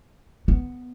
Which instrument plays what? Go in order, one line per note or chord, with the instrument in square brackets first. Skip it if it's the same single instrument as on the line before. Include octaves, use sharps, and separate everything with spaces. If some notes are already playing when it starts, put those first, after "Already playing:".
[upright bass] B3